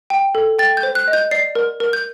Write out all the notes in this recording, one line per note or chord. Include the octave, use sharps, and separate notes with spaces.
G5
A4
G5 A6
G6
C5
F#6
D#5
G6
D5 C7
A#4
A#4
G6